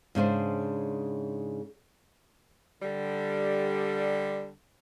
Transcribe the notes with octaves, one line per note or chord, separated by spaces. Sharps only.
G#2 C#3 D4 C5
D3 G3